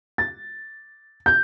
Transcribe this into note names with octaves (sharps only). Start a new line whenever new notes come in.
A6
G6